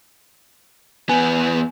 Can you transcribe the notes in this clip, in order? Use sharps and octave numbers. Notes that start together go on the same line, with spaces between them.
E2 B3 G#5